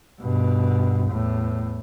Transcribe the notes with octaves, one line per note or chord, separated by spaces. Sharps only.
G2 B2
E2 A2